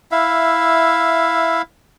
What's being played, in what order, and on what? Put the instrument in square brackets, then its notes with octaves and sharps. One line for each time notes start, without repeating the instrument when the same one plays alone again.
[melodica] E4 E5 F5